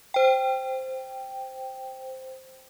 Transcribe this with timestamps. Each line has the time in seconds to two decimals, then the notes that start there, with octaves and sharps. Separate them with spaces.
0.14 C5 G5